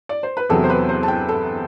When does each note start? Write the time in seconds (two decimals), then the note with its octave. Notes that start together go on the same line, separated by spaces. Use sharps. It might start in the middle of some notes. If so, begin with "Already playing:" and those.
0.09 D5
0.23 C5
0.37 B4
0.49 E2 C3 F#3 B3 A4
0.64 C5
0.70 B4
0.89 C5
1.03 A5
1.08 G5
1.29 A4